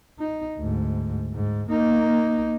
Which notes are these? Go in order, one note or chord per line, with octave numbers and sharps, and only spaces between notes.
D#4
D2 G#2
G#2
A#3 D#4